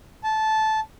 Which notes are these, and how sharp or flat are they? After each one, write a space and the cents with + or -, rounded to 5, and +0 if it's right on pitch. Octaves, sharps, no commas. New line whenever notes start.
A5 -15